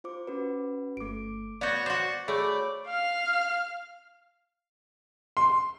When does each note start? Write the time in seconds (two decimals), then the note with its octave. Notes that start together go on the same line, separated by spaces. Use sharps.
0.04 F4 C5 D6
0.27 C#4 F#4 B4
0.97 G1 A3 D6 D7
1.61 B3 F#4 C#5 D5 G6 A6
1.86 F#4 C5 C#6 D6
2.28 A3 G#4 C#5 D5 B5 G6
2.87 F5 F6
5.37 C6